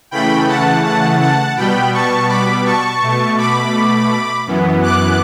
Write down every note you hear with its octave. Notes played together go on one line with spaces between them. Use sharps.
C#3 E3 A3 G5 B5
F#5 A5
F#5 A5
F#5 A5
B2 G3 B3 G5 B5
A5 C#6
B5 D6
A5 C#6
B2 A3
B5 D6
F#2 E3 B3
D6 F#6